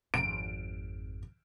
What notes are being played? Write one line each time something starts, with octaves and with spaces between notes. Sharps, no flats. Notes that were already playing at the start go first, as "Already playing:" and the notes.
G#1 F2 D7